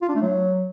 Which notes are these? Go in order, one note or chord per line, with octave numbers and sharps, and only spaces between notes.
F4
D4
A3
F#3